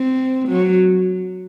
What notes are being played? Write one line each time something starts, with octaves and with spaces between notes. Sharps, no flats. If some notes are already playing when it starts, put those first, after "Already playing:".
Already playing: C4
F#3